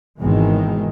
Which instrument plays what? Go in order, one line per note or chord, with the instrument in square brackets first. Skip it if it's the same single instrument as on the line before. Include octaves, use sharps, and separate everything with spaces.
[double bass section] G#1 B2 D#3 E3 G#3